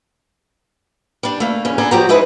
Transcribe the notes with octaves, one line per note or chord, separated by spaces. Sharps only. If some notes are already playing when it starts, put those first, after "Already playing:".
G3 D4
A3 A#3
E2 C#4
B3 D4 A4 G#5 A#5
F3 F#3 F#4 G4 G5 A#5
G#3 D#4 E4 B4 C5